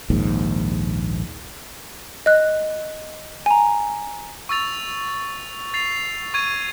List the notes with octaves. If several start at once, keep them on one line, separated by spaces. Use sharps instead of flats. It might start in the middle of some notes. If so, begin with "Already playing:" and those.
A#1 D#2 G#2
D#5 F#6
G#5 A#5
C#6 E6 A6 F7
A6 C7 F7
C#6 G#6 D#7